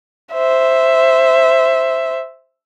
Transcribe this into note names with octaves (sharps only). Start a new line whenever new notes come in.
C5 E5